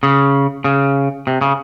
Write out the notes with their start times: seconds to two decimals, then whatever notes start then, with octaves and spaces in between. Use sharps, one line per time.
0.03 C#3
0.64 C#3
1.27 C3
1.41 C#3